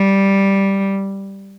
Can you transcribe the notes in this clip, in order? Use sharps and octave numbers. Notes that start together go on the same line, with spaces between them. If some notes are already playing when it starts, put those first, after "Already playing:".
Already playing: G3